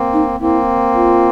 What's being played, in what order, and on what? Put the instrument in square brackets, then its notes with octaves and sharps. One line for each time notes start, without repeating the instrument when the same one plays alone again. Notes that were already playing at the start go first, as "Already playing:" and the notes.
Already playing: [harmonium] A#3 C4
[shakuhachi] D#4
[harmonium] A#3 C4 [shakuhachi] E4
[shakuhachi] F4